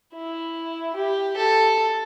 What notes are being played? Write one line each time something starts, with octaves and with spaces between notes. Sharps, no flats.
E4
G4
A4